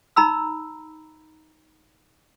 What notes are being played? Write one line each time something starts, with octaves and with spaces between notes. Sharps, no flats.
D#4 A#5 B5 E6